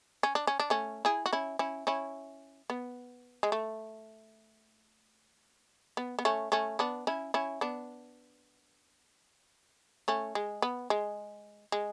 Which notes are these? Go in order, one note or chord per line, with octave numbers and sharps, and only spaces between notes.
C#4
D4
C#4
D4
A3 C#4
E4 G#4
F#4
C#4 E4
C#4 E4
C#4 E4
B3
G#3
A3
B3
B3
A3 C#4
A3 C#4
B3 D4
C#4 E4
C#4 E4
B3 D4
A3 C#4
G#3
B3
G#3
G#3